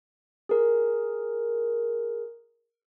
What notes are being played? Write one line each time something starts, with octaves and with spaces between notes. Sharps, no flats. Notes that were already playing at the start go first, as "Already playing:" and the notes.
G#4 A#4